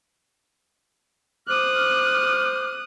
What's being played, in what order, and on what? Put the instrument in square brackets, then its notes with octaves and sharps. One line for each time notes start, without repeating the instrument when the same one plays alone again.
[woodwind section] C5 D6 F6 [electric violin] D#6 F#6